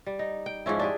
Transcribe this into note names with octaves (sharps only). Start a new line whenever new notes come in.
G3
D#4
G5
G#2 F3 C#4 E4
D4 G4 G#4